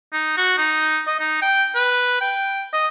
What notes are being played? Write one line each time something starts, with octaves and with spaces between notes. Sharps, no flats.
D#4
F#4
D#4
D#5
D#4
G5
B4
G5
D#5